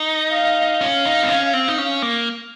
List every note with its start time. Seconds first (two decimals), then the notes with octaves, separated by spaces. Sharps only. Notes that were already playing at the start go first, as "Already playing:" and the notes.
Already playing: D#4
0.31 F5
0.80 C#4 F5
1.06 D#4
1.23 C4
1.29 C#4
1.53 C4
1.68 D#4
1.78 C#4
2.02 A#3